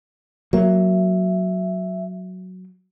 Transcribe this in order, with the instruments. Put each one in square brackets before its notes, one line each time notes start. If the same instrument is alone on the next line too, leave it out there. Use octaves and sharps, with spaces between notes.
[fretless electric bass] F#3 A#3 [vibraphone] E5